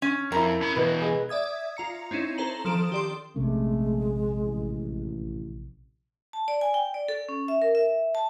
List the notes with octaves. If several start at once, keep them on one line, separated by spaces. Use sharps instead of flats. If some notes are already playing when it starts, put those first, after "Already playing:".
C#4
F2 E4 A#4 A#5
C#4 B5
B2 E3 B4 D#5
G#4 D#5
D5 E5 D#6 G#6
F4 A#5 C#7
C4 C#4 D#4 E4
A4 C5 A#5 F#7
D#3 F3 A4 D#6 D7 E7
G4 D5 C6
A#1 C3 G#3 A3 C#4
A1
A5
D5
G#5
G5
D5
A4
C#4
E5
A#4
E5
A5